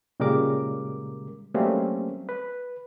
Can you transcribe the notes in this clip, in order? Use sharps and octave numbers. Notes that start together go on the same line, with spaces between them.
A#2 C#3 G3 G#3 A#4 D6
F#3 G3 A3 A#3 C4 C#4
B4